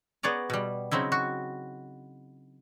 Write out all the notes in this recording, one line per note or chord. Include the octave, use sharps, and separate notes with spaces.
B3 G#4 C#5 D5 A#5
B2 G3
C#3 F#3 C4 D#4 E4
F#4